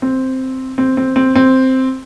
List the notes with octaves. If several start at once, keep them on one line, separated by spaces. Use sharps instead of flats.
C4
C4
C4
C4
C4